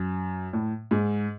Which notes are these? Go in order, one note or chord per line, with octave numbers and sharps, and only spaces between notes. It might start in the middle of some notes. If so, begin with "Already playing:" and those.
Already playing: F#2
A2
G#2